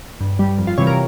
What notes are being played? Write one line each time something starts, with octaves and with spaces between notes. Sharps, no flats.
G2
G3
F2
F4
C3 E3 G3 C#5
A#4